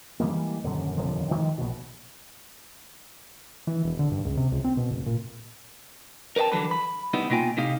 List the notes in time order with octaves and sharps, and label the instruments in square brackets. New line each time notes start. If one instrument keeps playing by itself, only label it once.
[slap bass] E3 G3 G#3 A#3
D#1 F#2 D3
D#1 F2 D3 F3
D#3 F3 G#3
A#1 B2
[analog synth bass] E3
E1
D3
G2
C#2
C3
C#2
C4
B2
F#1
A#2
[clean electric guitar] A#4 B4 C#5 G5 A5
D3 E3 F#3 G3 A4 B4
B5
G3 B3 D#4 E4
B2 A#3 F4 G5 G#5
A2 C3 D#4 G4 F5